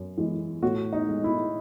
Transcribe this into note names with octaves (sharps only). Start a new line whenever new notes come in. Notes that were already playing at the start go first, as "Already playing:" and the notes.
Already playing: F#2
E3 G#3
A2 F#4
D#4
G#3
E4